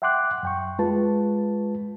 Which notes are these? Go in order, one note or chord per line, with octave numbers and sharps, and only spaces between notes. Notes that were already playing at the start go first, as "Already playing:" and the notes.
E5 F#5 G5 C6 D6 F#6
F#2 G5 C#6
G#3 F4 B4 A5